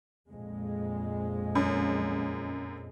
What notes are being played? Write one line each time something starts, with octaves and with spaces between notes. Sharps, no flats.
A#1 F2 G#3
F#2